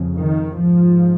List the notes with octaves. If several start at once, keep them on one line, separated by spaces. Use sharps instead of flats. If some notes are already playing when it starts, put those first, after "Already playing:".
Already playing: F2 C#3
D#3
G#2 F3